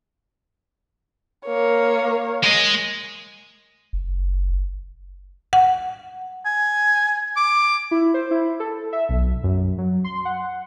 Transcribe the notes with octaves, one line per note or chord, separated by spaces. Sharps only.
A#3 C#5
G#3 D#5
F#1
F#5
G#5
D6
E4
C5
E4
A4
E5
B1
F#2
F#3
C6
F#5